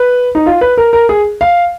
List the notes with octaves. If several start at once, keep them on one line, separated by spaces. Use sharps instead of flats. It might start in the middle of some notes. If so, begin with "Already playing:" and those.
Already playing: B4
D#4
F4
B4
A#4
A#4
G#4
F5